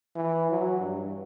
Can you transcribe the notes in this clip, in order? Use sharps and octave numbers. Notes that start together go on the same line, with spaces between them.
E3
F#3
G2